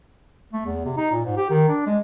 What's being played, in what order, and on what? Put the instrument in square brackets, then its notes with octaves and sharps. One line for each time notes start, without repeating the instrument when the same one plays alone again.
[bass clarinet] A3
E2
C3
D#4
A#2
G#2
G4
D#3
D4
G#3